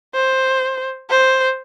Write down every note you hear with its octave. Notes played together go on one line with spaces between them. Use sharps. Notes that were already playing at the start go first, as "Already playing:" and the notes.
C5
C5